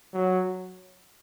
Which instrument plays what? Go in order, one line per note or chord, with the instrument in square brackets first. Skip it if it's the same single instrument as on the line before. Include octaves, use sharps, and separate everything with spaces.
[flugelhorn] F#3